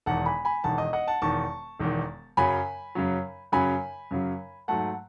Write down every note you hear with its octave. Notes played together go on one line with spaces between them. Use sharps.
E1 E2 D#3 F#5 A5
G#5 B5
G#5 B5
E1 E2 D#3 F#5 A5
D#5
D#5 F#5
F#5 A5
E1 E2 D#3 A5 C#6
E1 E2 D#3
F#2 C#3 F#3 G#5 B5
F#2 C#3 F#3
F#2 C#3 F#3 G#5 B5
F#2 C#3 F#3
G#2 F#3 A3 F#5 A5